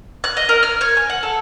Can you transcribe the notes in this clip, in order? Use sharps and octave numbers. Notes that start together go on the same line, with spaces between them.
F#6
D#5
A#4
F6
C#5
G#5
F#5
A4